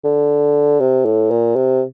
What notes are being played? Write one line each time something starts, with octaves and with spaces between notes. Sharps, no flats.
D3
C3
A2
A#2
C3